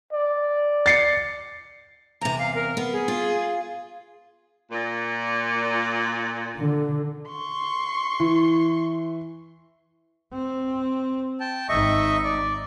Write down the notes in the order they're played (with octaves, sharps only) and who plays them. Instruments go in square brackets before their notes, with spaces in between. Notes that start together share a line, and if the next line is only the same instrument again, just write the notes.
[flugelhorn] D5
[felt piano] A6 C7 C#7
[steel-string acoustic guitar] E2 C3 [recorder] A#5
[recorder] F5
A#4
[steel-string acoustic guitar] B3
[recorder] G#4
[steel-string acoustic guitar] F4
[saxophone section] A#2
[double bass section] D3
[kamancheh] C6 C#6
[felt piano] E3
[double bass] C4
[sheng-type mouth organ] G5 A5
[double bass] G#1 D#4 [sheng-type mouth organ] D#5 E5 C#6
[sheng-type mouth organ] D5